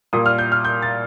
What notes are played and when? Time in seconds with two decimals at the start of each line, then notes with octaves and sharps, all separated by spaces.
0.13 A#2 G3 A#3 D#6
0.26 F6
0.38 G6
0.52 F6
0.65 G6
0.82 A6